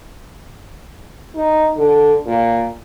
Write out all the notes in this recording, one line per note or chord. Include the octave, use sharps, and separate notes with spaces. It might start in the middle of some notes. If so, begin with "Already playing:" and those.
D#4
D3
A#2